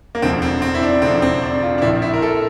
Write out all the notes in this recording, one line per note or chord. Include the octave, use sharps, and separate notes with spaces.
A#3
E1 D2 D3 F3 C4
C4
C4
E4
D4
E1 D2 D3 F3 C4
C4
D4
F4
D4
A#1 A#2 F3 E4
E4
A#4
A4